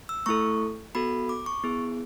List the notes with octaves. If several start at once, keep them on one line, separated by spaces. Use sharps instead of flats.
E6
A3 E4 A4 C#6
B3 F#4 A4 B5
D6
C#6
B3 E4 G#4